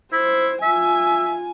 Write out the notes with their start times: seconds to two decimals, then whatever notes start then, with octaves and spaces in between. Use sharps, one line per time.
0.12 E4 C5
0.62 F4 E5 G#5